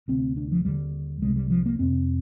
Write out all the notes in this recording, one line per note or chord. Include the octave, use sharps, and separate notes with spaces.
D2 C3 C4
D4
F3
D#2 D3 G3
C2 C3 G#3
G3
F3
A#3
F2 C3 C4